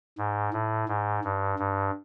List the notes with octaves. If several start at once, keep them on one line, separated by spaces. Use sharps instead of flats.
G#2
A2
G#2
G2
G2